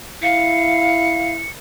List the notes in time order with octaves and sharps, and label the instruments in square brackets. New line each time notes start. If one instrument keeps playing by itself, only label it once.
[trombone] E4 [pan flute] F5 [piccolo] C#7